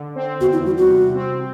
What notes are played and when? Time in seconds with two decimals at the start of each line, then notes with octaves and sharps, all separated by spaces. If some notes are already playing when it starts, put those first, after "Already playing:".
Already playing: D3
0.15 C4
0.40 E2 F#4
0.53 E4
0.65 G3 F#4
0.78 F#4
0.90 C3
1.15 C4